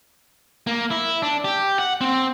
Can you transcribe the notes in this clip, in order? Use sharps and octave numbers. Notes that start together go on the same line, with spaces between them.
A#3
E4
D4
G4
F#5
C4